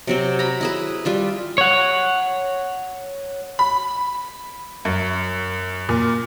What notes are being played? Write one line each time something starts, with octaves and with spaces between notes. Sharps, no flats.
C3 F#3 C4
A#5 B5
E4 G#4 B4
G3 F4 E5
C#5 F#5
B5
F#2
A#2